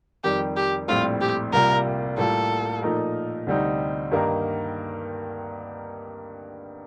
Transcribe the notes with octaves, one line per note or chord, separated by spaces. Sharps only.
F2 D#3 G3 G4
G4
A#1 A2 G3 C4 F4
G4
C2 C3 G3 A#3 F4 A#4
A2 G3 A#3 F4 A4
A#2 F3 A3 D#4 A#4
D2 C3 G3 C4 D#4
G2 D#3 A#3 D#4 A#4